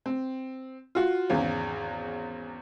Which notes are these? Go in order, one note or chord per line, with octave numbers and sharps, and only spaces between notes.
C4
F4 F#4
G#1 E2 C#3